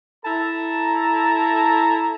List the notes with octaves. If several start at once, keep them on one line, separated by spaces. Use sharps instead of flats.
E4 A4 A5 A#5